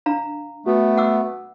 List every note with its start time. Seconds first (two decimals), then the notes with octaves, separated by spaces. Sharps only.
0.06 D4 F5 A#5
0.66 A3 B3 F#4
0.97 F#5 D6 E6